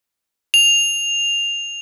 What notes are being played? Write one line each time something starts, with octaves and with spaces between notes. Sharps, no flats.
F7